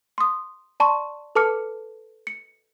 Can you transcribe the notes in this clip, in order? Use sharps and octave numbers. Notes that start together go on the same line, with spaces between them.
C6 D#6
D5 A5 C6 C#6
A4 B4 A5 D6 F6 C#7
C#7